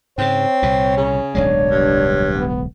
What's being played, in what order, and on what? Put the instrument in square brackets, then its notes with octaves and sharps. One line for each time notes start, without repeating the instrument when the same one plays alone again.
[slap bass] G#2 C#3 [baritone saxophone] C4 [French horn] C#5
[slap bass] C2 A#2
[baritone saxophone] C#3
[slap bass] D1 B1 G#3 [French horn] D4 [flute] C#5
[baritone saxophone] G2
[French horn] B3